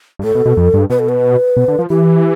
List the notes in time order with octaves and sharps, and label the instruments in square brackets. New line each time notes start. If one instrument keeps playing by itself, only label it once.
[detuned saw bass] G2
[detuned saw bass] A2 [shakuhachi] A4
[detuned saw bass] B2
B2
F2
G2
[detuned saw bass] B2 [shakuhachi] B4
[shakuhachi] A4
B4
[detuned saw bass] B2
D3
F3
[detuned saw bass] E3 [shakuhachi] G4